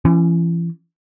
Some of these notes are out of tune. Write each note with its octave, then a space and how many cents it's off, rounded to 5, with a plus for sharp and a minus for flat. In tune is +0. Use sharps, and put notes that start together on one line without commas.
E3 +40 C#4 -5